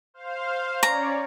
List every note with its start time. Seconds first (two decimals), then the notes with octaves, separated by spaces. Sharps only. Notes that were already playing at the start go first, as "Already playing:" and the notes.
0.14 C5 F5
0.83 C#4 C#5 D5 A#5